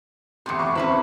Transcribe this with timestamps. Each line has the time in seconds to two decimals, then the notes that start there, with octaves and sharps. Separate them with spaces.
0.46 E2 A2 C3 C6 C#7
0.59 C#6 D6 C7
0.75 E2 C4 C#4 B4 E5